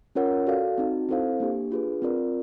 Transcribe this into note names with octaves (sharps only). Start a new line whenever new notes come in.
C#4 F4 A#4 C#5 F#5
F#4 A4 D5 F5
C4 D#4 F#4
C4 E4 A4 C5 F5
A#3 D4 G4
D4 F4 G#4 B4
C4 F4 A#4 D5